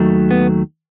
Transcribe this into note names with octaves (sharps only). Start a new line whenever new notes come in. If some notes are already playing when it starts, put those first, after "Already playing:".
Already playing: D#2 D#3 F#3 A3
B3